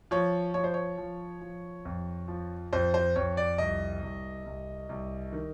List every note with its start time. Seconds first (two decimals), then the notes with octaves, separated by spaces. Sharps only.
0.11 F3 C#5
0.54 F3 C#5
0.64 C5
0.74 C#5
0.98 F3
1.41 F3
1.85 F2
2.28 F3
2.73 F2 C5
2.94 C5
3.16 F2 C#5
3.37 D5
3.58 C2 D#5
4.02 C2
4.45 C2
4.89 C2
5.33 D#3